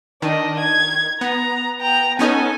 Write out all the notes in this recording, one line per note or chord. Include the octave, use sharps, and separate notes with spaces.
D#3 D4 D#5
G#6
B3 A#5
G5 A#5
B3 C#4 D#4 A4 G#5